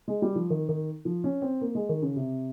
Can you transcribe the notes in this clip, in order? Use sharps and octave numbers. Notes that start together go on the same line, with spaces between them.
G#3
G3
F3
D#3
D#3
F3
C#4
C4
A#3
G#3
D#3
C#3
C3